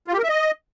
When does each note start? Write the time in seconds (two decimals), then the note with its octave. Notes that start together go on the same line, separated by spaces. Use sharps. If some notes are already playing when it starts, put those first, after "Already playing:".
0.08 F4
0.13 G4
0.18 A#4
0.24 E5
0.29 D#5